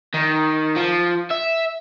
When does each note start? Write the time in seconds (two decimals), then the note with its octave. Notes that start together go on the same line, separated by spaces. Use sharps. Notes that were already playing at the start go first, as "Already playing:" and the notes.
0.14 D#3
0.76 F3
1.30 E5